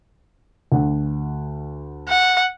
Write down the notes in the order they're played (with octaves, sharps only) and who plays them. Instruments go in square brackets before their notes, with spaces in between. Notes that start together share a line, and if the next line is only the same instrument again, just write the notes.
[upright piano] D2 F#5
[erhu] F#5